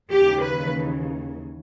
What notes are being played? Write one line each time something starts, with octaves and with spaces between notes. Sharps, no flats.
D#2 C#3 E3 G4
B4